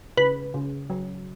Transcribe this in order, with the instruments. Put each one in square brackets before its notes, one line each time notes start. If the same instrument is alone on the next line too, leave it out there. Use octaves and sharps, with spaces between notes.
[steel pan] C#3 [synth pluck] B4
[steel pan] C#3
F#3